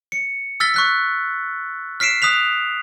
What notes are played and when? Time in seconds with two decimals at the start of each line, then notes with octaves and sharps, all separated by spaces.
0.12 C#7
0.60 E6 F6 A6 B6 G7
0.74 C#6 F#6 B6
2.00 F6 B6 C7 D7 E7
2.22 D#6 F#6 B6 F7